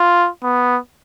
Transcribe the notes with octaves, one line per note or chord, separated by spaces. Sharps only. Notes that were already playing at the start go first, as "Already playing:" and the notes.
Already playing: F4
B3